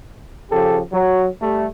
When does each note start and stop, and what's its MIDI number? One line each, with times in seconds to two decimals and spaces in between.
0.50 0.80 49
0.50 0.80 53
0.50 0.80 67
0.50 0.80 69
0.92 1.28 54
1.41 1.66 55
1.41 1.66 57